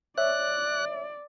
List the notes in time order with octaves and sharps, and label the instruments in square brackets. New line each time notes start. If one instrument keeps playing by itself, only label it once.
[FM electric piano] C#5 E5 [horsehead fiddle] D5 [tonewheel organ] F#6